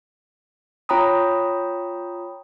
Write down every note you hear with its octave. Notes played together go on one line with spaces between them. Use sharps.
F4 C#5 G5 A#5 B5 D#6